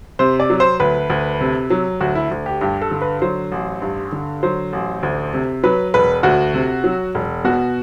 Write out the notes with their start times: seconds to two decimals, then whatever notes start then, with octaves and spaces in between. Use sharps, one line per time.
0.19 C3 C5
0.40 D5
0.50 F#3
0.60 C5
0.80 D2 B4
1.10 D2
1.41 C3
1.70 F#3
2.01 D2 F#4
2.15 E4
2.31 D2
2.46 G4
2.61 G2 G4
2.82 A4
2.91 D3
3.02 B4
3.22 F#3 C5
3.52 A1
3.82 G2
4.12 D3
4.43 F#3 C5
4.73 A1
5.03 D2
5.33 C3
5.63 F#3 B4
5.94 E1 B4
6.23 D2 F#4
6.54 C3
6.84 F#3
7.15 E1
7.44 B2 F#4